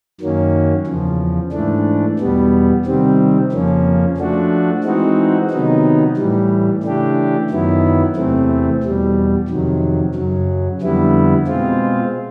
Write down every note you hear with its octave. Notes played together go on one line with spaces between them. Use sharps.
F#2 D#3 F#3 A#3 C#4
E2 C#3 F3
G#2 E3 A3 D4
E2 B2 G3 B3
C3 D#3 G3 C4
F2 C#3 F3 A#3 C#4
F3 A3 D4 F#4
E3 G#3 C4 D#4 F#4
C3 D#3 F#3 B3 D#4
A2 E3 G3
C#3 E3 A3 D4 G4
F#2 D#3 F#3 B3 E4
E2 C3 E3 A3 C4
E2 B2 G3
F2 C3 D#3 F#3
F#2 C#3 F#3
F2 D3 G3 B3 E4
B2 G#3 C4 F4